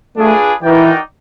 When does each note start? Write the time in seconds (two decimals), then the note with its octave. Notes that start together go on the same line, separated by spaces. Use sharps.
0.16 A3 D4 F4 G#4 B4
0.63 E3 D#4 F#4 A#4 D5 G5